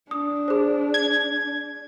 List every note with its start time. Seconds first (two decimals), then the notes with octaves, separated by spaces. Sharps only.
0.11 D4 D#6
0.48 G#4 C5
0.94 G#6